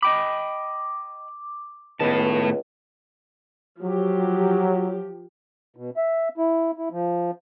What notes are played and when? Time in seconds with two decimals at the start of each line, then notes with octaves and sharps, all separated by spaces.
0.03 D#5 G5 B5 D6
2.00 C#2 A2 D#3 B3 A5
3.82 F3 F#3 G4
5.76 B2
5.97 E5
6.38 E4
6.78 E4
6.91 F3